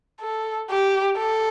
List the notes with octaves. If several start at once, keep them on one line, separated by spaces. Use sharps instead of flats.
A4
G4
A4